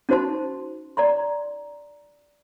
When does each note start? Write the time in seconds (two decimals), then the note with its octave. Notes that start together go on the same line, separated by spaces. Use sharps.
0.09 C#4 D#4 F#4 C5 A5 C6
0.97 D5 A#5 C6